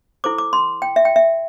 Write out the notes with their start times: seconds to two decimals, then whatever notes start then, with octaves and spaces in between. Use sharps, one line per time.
0.24 E4 A4 C5 D6
0.38 D6
0.53 C6
0.82 G5
0.96 E5
1.05 G5
1.16 E5